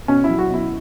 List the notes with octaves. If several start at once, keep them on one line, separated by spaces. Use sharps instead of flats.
B2 C#4
F#3 E4
F#4
B2 E4